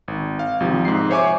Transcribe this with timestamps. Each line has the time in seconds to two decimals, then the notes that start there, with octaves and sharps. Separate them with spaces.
0.08 G#1
0.39 F5
0.60 G#1 C3 F3
0.85 G#2 C7
1.10 C5 C#5 E5 G#5 C#6 D6